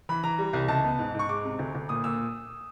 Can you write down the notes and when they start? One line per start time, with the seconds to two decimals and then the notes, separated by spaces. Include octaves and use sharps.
0.09 E3 B5
0.23 E3 A#5
0.38 G3
0.53 C2
0.68 C#2 A5
0.84 B3
0.99 G#2
1.14 G#2 C#6
1.29 G#3 D6
1.45 C3
1.59 D2
1.75 D2
1.89 A#2 D#6
2.04 A#2 E6